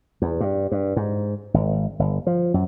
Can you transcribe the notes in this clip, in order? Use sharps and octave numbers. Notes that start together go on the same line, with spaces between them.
E2
G2
G2
G#2
G#1
G1
F3
F#2